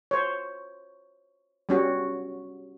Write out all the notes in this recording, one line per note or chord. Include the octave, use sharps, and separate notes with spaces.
C5 C#5
G3 C#4 F#4